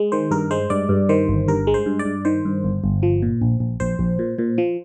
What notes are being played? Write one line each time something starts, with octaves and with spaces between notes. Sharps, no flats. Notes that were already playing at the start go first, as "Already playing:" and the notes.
Already playing: G#3
D#3 C5
G2 A#4
G#3 C5
G2 D5
G2
D#3 C5
G1
G2 A#4
G#3
C5
G2
D5
G2
D#3 C5
G2
G1
G1
F3
A#2
A#1
A#1
A#1 C5
A#1
A#2
A#2
F3